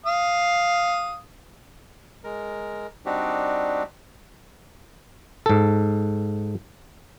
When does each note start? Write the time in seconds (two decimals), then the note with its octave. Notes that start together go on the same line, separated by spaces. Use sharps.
0.06 F5 D#6
2.24 G#3 A#4
3.06 G3 C4 D4 D#4 F#4 G4
5.46 G#2 A4